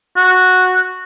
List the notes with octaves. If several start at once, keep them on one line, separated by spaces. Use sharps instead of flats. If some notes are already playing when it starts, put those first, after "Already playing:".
F#4